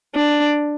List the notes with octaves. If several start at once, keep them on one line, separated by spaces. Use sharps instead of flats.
D4